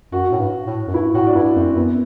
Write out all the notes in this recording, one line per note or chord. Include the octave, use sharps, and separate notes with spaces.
F#2 F#4
A2
G2
A2
F#2
G2 E4
A2 F#4
D4
G2 E4
F#2 C4
F#2 B3